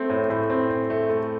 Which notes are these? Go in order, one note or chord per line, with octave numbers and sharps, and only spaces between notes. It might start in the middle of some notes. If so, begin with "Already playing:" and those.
Already playing: A3 C4
A2
A2
C4
C4
A3
A3